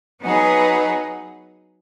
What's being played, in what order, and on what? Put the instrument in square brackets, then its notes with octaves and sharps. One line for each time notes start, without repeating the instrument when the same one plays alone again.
[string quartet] F#3 B3 D#4 G#4 B4